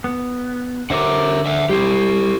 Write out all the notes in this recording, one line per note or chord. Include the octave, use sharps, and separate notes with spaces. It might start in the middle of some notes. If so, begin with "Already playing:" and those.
B3
D3 A#4 C5 E5 F#5 D6
E5 F#5
G3 E4 G4 C5